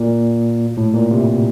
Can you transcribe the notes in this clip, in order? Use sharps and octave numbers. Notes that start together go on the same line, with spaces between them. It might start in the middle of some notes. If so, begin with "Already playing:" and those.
Already playing: A#2
A2
A#2
C3